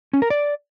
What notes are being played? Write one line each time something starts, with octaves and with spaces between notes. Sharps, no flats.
C#4
A#4
D5